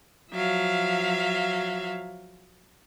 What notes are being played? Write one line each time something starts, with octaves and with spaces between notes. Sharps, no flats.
F3 F#3 E5 F5